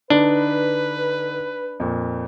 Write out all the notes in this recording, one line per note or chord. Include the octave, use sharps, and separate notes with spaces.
D3 D4 D#4 B4
F2 A#2